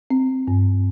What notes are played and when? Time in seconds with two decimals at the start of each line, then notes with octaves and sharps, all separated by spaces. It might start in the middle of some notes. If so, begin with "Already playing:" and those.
0.10 C4
0.48 G2